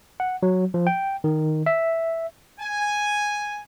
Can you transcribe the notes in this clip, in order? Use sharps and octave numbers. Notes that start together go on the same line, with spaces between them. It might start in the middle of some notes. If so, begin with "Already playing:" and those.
F#5
F#3
F3
G5
D#3
E5
G#5